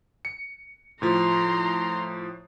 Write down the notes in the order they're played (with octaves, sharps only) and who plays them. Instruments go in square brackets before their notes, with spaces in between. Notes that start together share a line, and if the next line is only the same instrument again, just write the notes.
[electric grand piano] C#7
[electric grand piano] A2 F3 [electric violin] A#5 C6